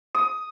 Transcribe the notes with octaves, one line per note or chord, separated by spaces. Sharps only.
D#6